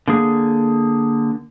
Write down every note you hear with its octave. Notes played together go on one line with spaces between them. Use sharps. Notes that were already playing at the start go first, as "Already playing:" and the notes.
D3 A#3 G#4